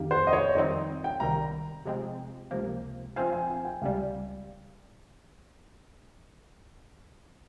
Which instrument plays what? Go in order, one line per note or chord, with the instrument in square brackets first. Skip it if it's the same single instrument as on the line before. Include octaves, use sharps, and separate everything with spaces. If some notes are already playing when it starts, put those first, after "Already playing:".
Already playing: [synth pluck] F2 D#3 A#3 D#4 G4
[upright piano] C5
D#5
C#5
[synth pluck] F2 D#3 G3 C4 D#4 [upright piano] D#5
[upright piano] G5
[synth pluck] C2 C3 D#3 G3 [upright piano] A#5
[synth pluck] C3 F3 G#3 C4
C#2 C3 F3 A#3
[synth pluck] F3 C4 F4 C5 F5 [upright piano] G#5
[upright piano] G#5
G#5
G5
[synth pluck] C#2 C3 G3 [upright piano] F5